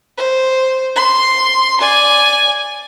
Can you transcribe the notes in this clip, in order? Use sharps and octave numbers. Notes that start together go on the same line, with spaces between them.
C5
C6
D5 G#5